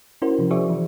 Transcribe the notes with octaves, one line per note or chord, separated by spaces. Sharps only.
C#4 E4 F#4 A#4 C5
C3 F3
F#4 G#4 C5 D5 E5 C#6
E3